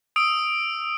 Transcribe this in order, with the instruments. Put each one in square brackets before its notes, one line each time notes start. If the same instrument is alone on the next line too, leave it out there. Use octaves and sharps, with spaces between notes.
[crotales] D#6 E6 D7